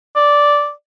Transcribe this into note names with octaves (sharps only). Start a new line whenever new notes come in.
D5